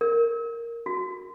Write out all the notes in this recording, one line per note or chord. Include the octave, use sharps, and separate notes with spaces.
A#4
F#4